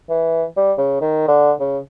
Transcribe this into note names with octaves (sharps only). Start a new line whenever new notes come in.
E3
G3
C#3
D#3
D3
C#3